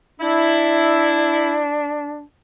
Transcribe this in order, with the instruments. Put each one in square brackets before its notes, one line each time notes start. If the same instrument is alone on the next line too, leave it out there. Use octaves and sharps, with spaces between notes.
[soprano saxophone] D4 [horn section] E4